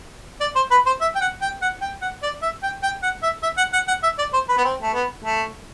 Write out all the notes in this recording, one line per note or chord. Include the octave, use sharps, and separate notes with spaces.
D5
C5
B4
C5
E5
G5
F#5
G5
F#5
G5
F#5
D5
E5
G5
G5
F#5
E5
E5
F#5
F#5
F#5
E5
D5
C5
B4
B3
C4
A3
B3
A3